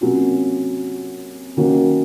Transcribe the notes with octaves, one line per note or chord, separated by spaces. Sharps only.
C3 F#3 A#3 C#4 F4
D#3 F#3 A#3 C#4 F#4